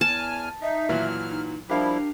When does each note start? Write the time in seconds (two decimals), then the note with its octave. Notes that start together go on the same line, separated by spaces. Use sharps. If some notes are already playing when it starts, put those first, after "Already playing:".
0.01 E2 G#5 A5 F6
0.62 D#4 E5
0.89 A#2 E3 F#3 F6
1.30 D#4
1.70 F3 G3 D4 E4 G4 A#4 F5